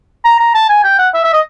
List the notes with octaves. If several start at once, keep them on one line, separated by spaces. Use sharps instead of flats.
A#5
A#5
A5
G#5
G5
F#5
E5
E5
D#5